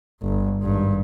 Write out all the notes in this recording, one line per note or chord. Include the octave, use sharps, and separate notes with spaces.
G1
G#1 G2